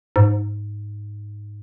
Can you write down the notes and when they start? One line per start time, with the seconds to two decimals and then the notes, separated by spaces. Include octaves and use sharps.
0.16 G#2